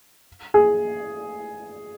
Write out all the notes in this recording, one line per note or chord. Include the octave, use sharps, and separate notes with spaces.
G#4